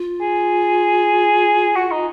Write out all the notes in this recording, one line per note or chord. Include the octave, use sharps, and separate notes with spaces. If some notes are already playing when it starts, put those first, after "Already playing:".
Already playing: F4
G#4
F#4
D#4